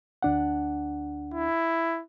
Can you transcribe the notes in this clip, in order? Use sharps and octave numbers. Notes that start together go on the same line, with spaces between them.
D2 D4 F#5
E4